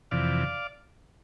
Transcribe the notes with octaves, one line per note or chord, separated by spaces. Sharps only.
F2 C3 E3 D5 F5